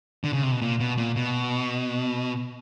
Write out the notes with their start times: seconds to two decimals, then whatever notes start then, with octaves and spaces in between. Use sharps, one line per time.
0.24 D3
0.33 C#3
0.43 C3
0.52 B2
0.62 A#2
0.80 B2
0.98 A#2
1.16 B2